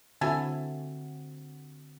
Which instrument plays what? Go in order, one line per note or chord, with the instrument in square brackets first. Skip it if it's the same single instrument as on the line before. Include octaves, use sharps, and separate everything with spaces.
[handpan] D3 C4 F#4 [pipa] E4 A4 G#5